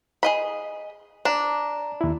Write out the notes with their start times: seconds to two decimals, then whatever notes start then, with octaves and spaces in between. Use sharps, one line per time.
0.23 G#4 D#5 B5
1.25 D4 A#5
2.01 D#2 E4